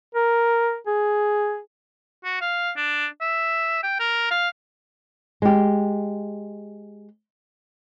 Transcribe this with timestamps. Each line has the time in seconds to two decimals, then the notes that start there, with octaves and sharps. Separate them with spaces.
0.15 A#4
0.87 G#4
2.24 F#4
2.41 F5
2.76 D4
3.21 E5
3.83 G5
3.99 A#4
4.31 F5
5.42 G#3 G4